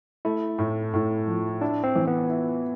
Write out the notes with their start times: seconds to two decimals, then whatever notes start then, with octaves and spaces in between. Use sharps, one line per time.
0.25 A3 E4
0.58 A2
0.94 A2
1.28 F3
1.61 D4 E4
1.84 C4
1.96 E3
2.07 B3
2.29 E4